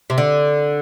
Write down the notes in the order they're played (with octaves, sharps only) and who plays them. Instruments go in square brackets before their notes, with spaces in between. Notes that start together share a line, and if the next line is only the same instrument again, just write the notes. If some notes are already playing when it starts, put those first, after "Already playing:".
[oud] C3
D3